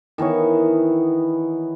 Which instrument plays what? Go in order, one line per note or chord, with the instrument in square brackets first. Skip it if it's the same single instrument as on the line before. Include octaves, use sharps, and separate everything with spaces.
[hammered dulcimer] D#3 E3 B3 C#5